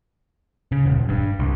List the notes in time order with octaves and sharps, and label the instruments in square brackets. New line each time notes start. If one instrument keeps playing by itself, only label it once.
[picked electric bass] C#3
D#1
G2
C2